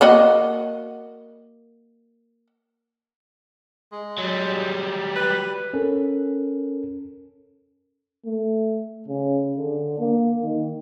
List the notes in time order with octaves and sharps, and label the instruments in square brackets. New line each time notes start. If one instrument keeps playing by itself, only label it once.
[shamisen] A#3 F#4 D#5
[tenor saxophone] G#3
[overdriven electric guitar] F#3 G3
[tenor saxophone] B4
[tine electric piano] C#4 A4 A#4
[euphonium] A3
C#3
D3
A#3
D#3